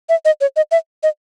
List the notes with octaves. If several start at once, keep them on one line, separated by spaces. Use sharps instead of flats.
E5
D#5
C#5
D#5
E5
D#5